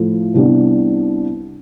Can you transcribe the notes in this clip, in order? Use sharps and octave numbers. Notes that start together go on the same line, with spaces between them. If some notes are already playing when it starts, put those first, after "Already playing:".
Already playing: A2 F3 A3 E4
C2 C3 G3 B3 D4